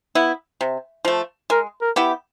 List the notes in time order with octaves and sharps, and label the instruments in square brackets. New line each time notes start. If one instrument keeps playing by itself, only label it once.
[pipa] B3 E4
C3
F3 A3
[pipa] G#3 [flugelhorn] A#4
[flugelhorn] A#4
[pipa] B3 E4 G4